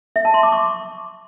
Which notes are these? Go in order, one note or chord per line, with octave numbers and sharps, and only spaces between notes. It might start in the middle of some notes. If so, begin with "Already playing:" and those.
E5
A5
C6
D6
C#6